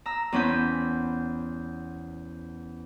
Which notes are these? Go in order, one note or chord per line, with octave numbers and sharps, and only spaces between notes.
A#5 E6
E2 C4 C#4 B5 G6